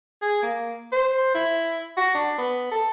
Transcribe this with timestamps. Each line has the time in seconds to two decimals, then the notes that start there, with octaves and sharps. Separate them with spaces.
0.22 G#4
0.43 A#3
0.92 C5
1.35 E4
1.97 F#4
2.15 D4
2.38 B3
2.72 A4